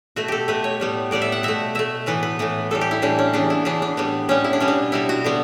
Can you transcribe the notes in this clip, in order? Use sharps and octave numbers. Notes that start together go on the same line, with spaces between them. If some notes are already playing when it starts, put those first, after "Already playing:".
B2 A3 F#4
G4 A4
B2 A3 B4
C#5
A2 G3 B3
A2 G3 B3 D5
E5
F#5
B2 A3 E5
B2 A3 E5
A2 E3 B3 B4
B4
A2 E3 B3
A2 E3 G3 A4
G4
E4
A2 E3 G3 D4
C#4
C#3 E3 B3 D4
E4
C#3 E3 B3 D4
D4
A2 G3 B3
A2 G3 B3 C#4
E4
D4
B2 G3 B3 C#4
D4
B2 G3 B3 E4
F#4
D3 G3 B3